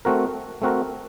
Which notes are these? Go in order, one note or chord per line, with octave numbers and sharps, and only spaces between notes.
A3 C4 F#4 A#4
A3 C4 F#4 A#4